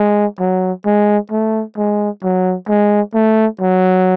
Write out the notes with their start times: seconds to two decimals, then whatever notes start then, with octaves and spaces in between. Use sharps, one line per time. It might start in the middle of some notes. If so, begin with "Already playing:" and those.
Already playing: G#3
0.40 F#3
0.86 G#3
1.31 A3
1.77 G#3
2.23 F#3
2.69 G#3
3.14 A3
3.61 F#3